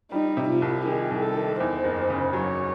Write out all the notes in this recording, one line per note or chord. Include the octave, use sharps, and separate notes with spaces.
G3 D#4
C3
F4
C2
D#3 G#4
C2
A4
D#3
E2 C5
F#1
C#3
F#3 C#5